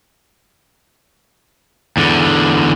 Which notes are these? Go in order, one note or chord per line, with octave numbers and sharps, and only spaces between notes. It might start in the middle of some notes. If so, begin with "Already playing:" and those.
E2 D3